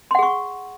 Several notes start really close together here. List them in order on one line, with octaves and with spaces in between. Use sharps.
C6 F#5 G#4 C#6